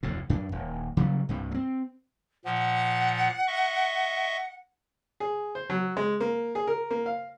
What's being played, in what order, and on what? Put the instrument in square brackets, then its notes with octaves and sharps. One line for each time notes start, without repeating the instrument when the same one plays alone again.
[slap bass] F1 D2 A2
F#2 D4
D#1
C#3 F#3 G3
C2 G2 C3
A3 C4
[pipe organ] A#2 F3 [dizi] F#5
[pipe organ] D#5 E5 C#6
[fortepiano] G#4
C5
F#3
G#3
A#3
G#4
A#4
A#3
F5